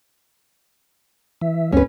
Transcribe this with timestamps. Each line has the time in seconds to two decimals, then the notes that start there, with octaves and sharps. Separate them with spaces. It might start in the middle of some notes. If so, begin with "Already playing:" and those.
1.41 E3 E5
1.73 D2 C4 C#4 B4